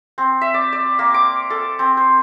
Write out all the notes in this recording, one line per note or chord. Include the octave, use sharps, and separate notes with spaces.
C4
E5
D5
D5
A#3
D6
A4
C4
C5